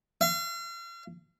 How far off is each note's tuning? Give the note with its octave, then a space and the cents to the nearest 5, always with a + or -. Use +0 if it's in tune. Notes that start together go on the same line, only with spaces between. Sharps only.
F5 -40